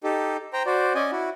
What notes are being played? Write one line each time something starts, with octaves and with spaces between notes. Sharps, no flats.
D#4 G4 A4
C5 G5 A#5
F#4 C5 D5
C#4 D5 D#5 G#5
E4 F#4